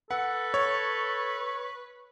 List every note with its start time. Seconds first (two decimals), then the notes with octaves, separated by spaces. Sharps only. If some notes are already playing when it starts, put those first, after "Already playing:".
0.11 A4 B4 F#5
0.54 C#5 C#6